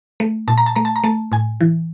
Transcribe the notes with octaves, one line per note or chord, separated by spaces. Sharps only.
A3
A#2 A5
A#5
A5
A3 A#5
A5
A#5
A3 A5
A2 G#5
E3